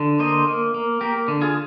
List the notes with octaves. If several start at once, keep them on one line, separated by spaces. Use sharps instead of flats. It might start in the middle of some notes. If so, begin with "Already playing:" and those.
Already playing: D3
A#3 C5 D#5
A#3
A#3
A#3 G4 A#4
D3
F4 G#4